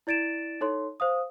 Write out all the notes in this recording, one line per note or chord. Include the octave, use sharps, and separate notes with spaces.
E4 D5 A6 D7 E7
D#4 A4 C#5 C6
C5 F5 D#6